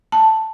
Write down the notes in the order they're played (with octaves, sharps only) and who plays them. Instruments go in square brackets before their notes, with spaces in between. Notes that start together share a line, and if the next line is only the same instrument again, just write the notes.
[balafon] A5